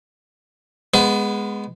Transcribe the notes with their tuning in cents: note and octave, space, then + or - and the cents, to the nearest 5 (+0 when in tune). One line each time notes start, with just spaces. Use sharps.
G#3 +0 B3 +0 B4 +40